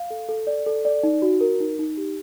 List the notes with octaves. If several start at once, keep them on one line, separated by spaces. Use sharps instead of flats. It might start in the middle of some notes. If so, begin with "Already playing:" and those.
Already playing: F5
A4
A4
D5
A4
D5
D#4
F#4
A#4
D#4
D#4
G4